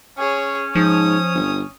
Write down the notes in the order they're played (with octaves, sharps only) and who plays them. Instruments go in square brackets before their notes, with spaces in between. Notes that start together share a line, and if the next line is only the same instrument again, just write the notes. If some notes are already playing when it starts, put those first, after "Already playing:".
[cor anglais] C#4 [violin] G#4 C#5
[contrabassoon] G#2 [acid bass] F3 [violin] D#6
[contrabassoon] G1